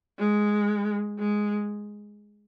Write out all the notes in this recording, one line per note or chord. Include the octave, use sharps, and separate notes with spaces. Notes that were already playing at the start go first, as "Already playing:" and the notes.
G#3
G#3